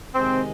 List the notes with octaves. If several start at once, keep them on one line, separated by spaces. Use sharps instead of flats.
C3 D#3 G#3 C4